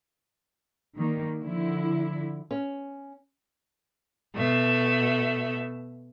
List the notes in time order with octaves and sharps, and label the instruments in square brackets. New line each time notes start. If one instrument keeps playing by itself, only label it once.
[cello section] D#3 G3 A#3
D3 F3 E4
[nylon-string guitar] C#4
[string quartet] B2 A3 E5